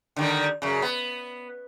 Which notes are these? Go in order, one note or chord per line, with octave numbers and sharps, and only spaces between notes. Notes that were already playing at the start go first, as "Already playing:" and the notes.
D3 D#3 G3
F#2 C#3
B3